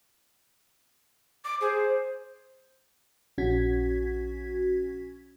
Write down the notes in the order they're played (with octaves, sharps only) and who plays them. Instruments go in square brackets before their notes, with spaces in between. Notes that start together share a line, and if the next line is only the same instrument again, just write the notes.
[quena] D6
[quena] G#4 [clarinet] C5
[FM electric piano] A#1 C#4 F#4 G#6 B6